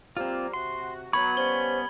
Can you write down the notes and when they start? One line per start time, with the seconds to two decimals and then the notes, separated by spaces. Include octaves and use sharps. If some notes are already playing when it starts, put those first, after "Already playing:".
0.17 F3 G3 A#3 C4 F4
0.54 C3 F#4 C6
1.13 F#3 B3 B5 C#6 G#6 F#7
1.37 F3 G3 C#4 C5 G7